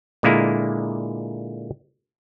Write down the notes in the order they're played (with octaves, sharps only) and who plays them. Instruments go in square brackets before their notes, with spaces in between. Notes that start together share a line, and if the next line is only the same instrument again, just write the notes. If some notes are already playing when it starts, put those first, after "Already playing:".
[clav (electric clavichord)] A#2 D3 G#3 A#3 E4